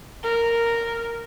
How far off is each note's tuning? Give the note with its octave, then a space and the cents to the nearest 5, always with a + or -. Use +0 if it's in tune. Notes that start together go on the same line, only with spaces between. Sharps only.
A#4 -5